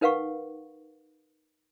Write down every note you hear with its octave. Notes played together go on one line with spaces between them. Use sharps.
D#4 A#4 B4 F5 F#5 C#6